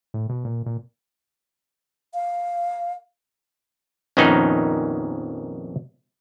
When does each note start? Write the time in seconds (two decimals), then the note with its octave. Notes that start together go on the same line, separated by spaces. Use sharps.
0.14 A2
0.29 B2
0.45 A#2
0.66 A#2
2.14 F5
4.17 A#1 F2 D#3 B3 C#4 D#4